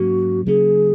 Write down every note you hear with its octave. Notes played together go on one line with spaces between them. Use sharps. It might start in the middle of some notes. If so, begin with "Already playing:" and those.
Already playing: G#2 F#3 A#3 C#4 F#4
C#3 F#3 A#3 C#4 G#4